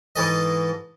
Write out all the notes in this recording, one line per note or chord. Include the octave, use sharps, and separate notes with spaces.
G#2 E3 A4 D#5